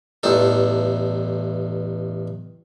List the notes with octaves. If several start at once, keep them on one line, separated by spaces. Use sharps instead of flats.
A1 E2 G2 D#4 A4